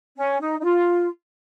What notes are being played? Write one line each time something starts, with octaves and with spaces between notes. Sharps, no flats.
C#4
D#4
D#4
F4